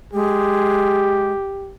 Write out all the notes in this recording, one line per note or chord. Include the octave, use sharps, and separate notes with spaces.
G#3 G4